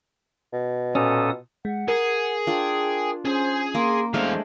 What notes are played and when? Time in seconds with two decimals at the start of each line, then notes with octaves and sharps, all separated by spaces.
0.53 B2
0.95 A#2 C#4 A4 D#6
1.65 G#3 F#5
1.88 G#4 A#4
2.47 D4 F4 G5
3.25 C#4 G#4 C5 G#5
3.75 A#3 C6
4.14 E2 G#3 A3 D4 C5 F5